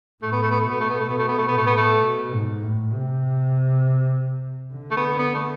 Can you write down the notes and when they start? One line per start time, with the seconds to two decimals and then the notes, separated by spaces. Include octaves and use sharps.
0.22 A2 A3
0.32 B3
0.42 A3
0.51 B3
0.60 A3
0.67 B2 B3
0.80 A3
0.90 B3
1.00 A3
1.09 B2 B3
1.18 A3
1.28 B3
1.38 A3
1.48 B3
1.57 A2 A3
1.67 B3
1.77 A3
2.03 B2
2.33 G#2
2.63 A2
2.94 C3
4.74 D3
4.91 A3
4.97 B3
5.19 B3
5.35 A3